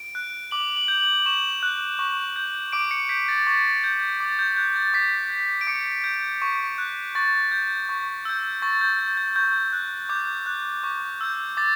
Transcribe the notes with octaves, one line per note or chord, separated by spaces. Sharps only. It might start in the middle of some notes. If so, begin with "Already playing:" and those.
Already playing: D7
F#6
D6 F#7
F#7
G6
F#7
C#6 E7
F#6
C#6
G6
D6 D7
C#7
G6 B6
A6
C#6 A6
G6
D6 A6
G6
F#6 G6
A6
D6 B6
G6
D7
D6 C#7
G6
C#6
F#6
C#6 A6
G6
C#6
E6 G6
C#6 A6
G6
G6 A6
G6
C#6 G6
F#6
D6 G6
F#6
C#6
E6 G6
D6 A6